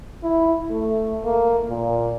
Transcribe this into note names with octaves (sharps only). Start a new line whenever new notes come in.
E4
A3
A#3
A#2